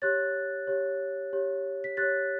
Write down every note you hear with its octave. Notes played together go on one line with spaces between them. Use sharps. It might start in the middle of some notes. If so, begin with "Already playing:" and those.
G4 C#5 F#6 A6
G4 C#5
G4 C#5
B6
G4 C#5 F#6 A6